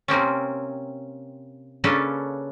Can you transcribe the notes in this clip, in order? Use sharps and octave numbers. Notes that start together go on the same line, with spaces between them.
C3 A#3 C4 C#4
C#3 A#3 C#4 D4 A4 B4